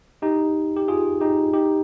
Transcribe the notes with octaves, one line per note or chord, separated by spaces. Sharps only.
D#4 G4
G4
F4 G#4
D#4 G4
D#4 G4